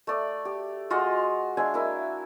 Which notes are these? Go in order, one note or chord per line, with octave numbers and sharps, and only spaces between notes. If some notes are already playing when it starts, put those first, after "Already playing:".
A3 D5
G4
G#3 F4 F#4 D#5
G#3 D4 E5 G#5
A#3 E4